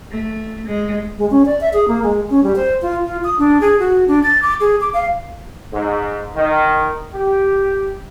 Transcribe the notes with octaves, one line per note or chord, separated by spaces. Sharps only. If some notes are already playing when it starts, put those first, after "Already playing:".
A3
G#3
G#3
C#4
D5
E5
G#4
A#3
G#3
C#4
G3
C5
F4
F4
D#6
D4
G#4
F#4
D4
A6
D6
G#4
D6
F5
G#2
D#3
G4